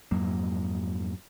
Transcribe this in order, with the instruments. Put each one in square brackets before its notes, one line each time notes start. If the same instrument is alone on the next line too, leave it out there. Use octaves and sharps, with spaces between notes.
[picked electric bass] F2 G#2 F#3 A#3